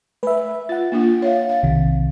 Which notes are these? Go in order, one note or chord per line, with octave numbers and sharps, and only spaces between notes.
A3 B4 E5
F4 F#5 A6
A#3 D4 F4
C#5 E5 F5
F5
B1 C3 D#3